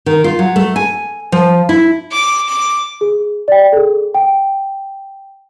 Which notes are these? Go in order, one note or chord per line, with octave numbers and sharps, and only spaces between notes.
D#3
F4
F#3
A3
G#5
F3
E4
D6
D6
G#4
D5 G5
G#4 A4
G5